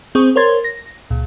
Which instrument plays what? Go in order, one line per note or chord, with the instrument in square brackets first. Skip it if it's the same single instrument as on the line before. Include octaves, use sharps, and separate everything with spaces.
[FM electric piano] C4 G#4 C5 C#6 D#6
A#4 C5 C#5 C6 G#6 A6
A#6
C#2 A#2